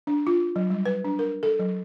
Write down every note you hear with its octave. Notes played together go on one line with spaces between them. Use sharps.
D4
F4
F#3
G3
B4
D4
A#4
A4
F#3